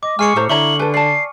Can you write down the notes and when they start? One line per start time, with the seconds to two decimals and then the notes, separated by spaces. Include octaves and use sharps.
0.03 D#5 D6
0.19 G#3 G#5 C#6 F6 C7 C#7
0.36 A2 A4 C5 A#5
0.49 D3 E4 C#5 A#5 C#6 F#7
0.79 A4 B4 G#5
0.94 D5 A5 C7